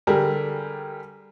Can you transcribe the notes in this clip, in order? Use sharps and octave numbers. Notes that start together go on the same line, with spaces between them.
D3 G3 G4 G#4 A#4